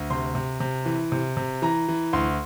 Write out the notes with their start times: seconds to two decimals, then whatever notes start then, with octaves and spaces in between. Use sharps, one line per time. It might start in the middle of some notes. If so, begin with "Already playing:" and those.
Already playing: D2
0.10 C3 C6
0.35 C3
0.60 C3
0.86 E3
1.12 C3
1.37 C3
1.62 E3 A#5
1.88 E3
2.13 D2 C6